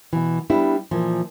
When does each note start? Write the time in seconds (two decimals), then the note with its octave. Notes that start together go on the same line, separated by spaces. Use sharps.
0.13 B2 E3
0.50 G3 B3 D4 E4
0.91 A#2 E3 F3